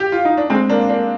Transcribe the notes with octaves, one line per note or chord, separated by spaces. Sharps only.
G4
F4
D#4
D4
G#3 C4
A#3 D4
A#3 D4